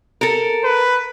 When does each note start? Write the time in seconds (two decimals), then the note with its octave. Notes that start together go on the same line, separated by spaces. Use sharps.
0.21 A4 A#4
0.64 B4